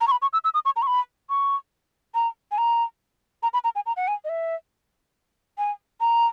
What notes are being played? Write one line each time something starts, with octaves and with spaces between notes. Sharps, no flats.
A#5
C#6
B5
C#6
E6
E6
D#6
C#6
A#5
C#6
B5
C#6
A#5
G#5
A#5
A#5
B5
A#5
G#5
A#5
F#5
G#5
D#5
E5
G#5
A#5